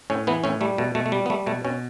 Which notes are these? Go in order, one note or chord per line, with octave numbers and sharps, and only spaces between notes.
A2 C#4
E3 B3
A2 C#4
G3 A3
B2 A3
B2 A3
A3
G3
B3
G3 A3
B2 A3
B2 C#4